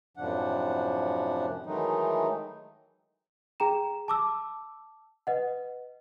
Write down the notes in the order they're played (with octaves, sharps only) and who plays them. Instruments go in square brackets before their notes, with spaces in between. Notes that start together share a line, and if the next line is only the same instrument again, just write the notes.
[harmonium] F#2 A2 C3 F3 D4 F#5
D#3 E3 F#3 G#3 A3 D#4
[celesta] G#4 G5 A#5 E7
A5 D6 E6
B4 D#5 F#5